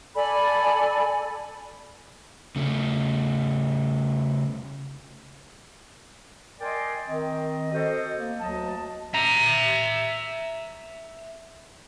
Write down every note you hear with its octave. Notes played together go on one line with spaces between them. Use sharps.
A4 D5 G#5 B5
C#3 A3
A#4 D5 D#5 G5 G#5 C6
D#3 C4 D#5
F#4 A4 C5 D#5
A#3
D2 F#3 D#5 A5
E5 A#5